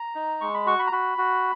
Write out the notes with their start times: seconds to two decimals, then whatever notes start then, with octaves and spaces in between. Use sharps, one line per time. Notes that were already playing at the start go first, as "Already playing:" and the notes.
Already playing: A#5
0.15 D#4
0.41 G#3 C#6
0.54 B5
0.66 F#4 C#6
0.79 B5
0.87 A#5
0.92 F#4 B5
1.18 F#4